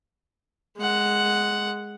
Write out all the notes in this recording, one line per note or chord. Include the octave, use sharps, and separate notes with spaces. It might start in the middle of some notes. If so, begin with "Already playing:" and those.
G#3 F#5